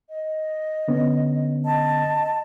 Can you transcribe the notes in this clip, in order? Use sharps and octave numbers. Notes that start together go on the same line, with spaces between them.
D#5
D3 B3 C#4
D#5 A5